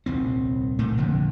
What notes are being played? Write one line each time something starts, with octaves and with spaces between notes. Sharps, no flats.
D#1 C2 C4
F#1 A#2 A3 A#3
F1 A#1 F2 D3